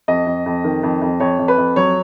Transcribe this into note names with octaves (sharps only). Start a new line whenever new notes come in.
F2 D#5
F2
F2
D#3
F2
F2
F2 C#5
F2
B4
F2
F#3 C#5